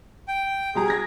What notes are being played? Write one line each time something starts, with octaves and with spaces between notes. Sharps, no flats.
G5
B2 G3 G#4 A#5
G#6 A#6